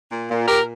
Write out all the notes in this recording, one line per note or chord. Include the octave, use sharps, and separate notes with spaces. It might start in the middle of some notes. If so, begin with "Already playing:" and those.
A#2
A#2
A#2 G4 A#4